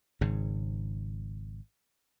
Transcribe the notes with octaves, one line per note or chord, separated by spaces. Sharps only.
G#1 G#2 C#3